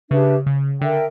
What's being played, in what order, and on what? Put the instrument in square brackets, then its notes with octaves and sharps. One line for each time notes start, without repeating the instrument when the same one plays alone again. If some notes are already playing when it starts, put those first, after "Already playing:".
[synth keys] C#3 [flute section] D4 G4 B4 E5
[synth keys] C#3
[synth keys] D3 [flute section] A#4 E5 G5